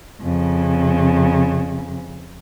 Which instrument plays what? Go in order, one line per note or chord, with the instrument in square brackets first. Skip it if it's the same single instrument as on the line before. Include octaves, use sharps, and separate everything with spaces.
[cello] F2 C#3